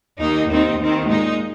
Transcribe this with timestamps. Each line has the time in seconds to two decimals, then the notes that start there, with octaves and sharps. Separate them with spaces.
0.19 D#2 D#3 A#3 D#4
0.49 D#2 D#3 C4 D#4
0.79 D#2 D#3 C4
1.07 A#2 G#3 D#4